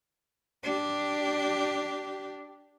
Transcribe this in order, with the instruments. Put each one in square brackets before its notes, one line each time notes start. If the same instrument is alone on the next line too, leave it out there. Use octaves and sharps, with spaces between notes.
[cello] D4 G4